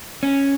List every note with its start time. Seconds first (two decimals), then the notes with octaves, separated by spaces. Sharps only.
0.23 C#4